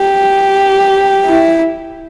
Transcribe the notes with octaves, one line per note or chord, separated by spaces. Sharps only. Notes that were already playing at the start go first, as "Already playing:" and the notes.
Already playing: G4
E4